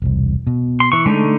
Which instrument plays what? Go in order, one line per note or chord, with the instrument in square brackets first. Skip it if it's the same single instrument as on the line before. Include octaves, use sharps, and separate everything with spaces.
[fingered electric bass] E1 C2
B2
[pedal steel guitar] C6
E3 C#6
[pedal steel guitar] D3 A3 D#4 [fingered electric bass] G#3